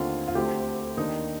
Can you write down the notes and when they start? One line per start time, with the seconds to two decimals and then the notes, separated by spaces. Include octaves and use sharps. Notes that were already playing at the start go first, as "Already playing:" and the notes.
Already playing: D#2 D3 A3 C4 F4
0.28 F4
0.35 D2 D3 A3 C4 G4
0.97 D#2 D#3 A#3 D4 D#4